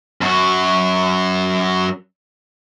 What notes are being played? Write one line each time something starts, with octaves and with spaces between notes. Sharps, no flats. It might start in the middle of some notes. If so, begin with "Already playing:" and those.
F#2 F#4